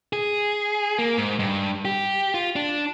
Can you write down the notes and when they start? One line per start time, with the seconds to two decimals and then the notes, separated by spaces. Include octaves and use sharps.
0.13 G#4
0.99 A#3
1.18 G#2
1.39 G2
1.85 G4
2.34 F4
2.56 D4